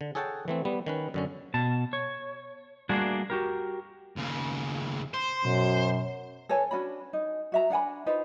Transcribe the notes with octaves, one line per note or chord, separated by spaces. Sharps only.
D3
G#4 A4 C#5 F#5 G5 A5
E3 A3 C4
G3 B3
D#3 C#4 B4
F#2 D3 C#4
B2 A5
C#5
G3 A3 A#3 D4 F#4 G#4
F#4 G4 A#4
D#2 C#3
C5 C6
F#2 B2
A4 B4 C#5 G#5
C#4 D4 F#4 B5
D#4
F#4 E5 A#5
D4 F#5 G#5 B5
D#4 F4 B4 C5